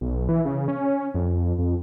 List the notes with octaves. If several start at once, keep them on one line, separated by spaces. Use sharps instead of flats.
B1
E3
C#3
C#4
F2
F2